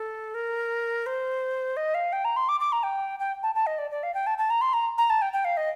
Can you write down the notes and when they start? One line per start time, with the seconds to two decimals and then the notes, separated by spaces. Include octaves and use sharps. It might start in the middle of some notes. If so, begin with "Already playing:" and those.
Already playing: A4
0.34 A#4
1.06 C5
1.77 D#5
1.94 F5
2.13 G5
2.25 A#5
2.36 C6
2.49 D6
2.60 D6
2.72 A#5
2.83 G5
3.19 G5
3.43 A5
3.55 A5
3.66 D#5
3.78 D5
3.91 D5
4.03 F5
4.14 G5
4.27 A5
4.38 A5
4.50 A#5
4.61 C6
4.73 A#5
4.98 A#5
5.10 A5
5.22 G5
5.33 G5
5.45 F5
5.57 D#5